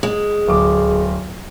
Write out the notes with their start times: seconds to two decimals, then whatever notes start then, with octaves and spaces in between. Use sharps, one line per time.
0.03 G#3
0.48 D1 D6